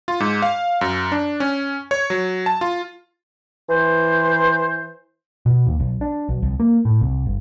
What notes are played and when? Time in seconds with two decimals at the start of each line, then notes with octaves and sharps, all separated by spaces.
0.08 F4
0.20 G#2
0.42 F5
0.81 F#2
1.12 D4
1.40 C#4
1.91 C#5
2.10 F#3
2.46 A5
2.61 F4
3.70 E3 C5
5.46 B2
5.67 D#2
5.80 B1
6.01 D4
6.29 B1
6.42 C2
6.60 A#3
6.85 A2
7.01 C2
7.26 G1